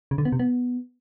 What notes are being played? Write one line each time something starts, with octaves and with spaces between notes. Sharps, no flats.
C#3
D3
B3
C3
B3